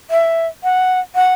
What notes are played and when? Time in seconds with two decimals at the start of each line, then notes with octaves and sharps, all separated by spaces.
0.11 E5
0.64 F#5
1.15 F#5